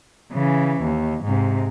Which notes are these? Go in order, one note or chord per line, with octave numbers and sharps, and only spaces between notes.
C#3 E3
D#2
G#2 C3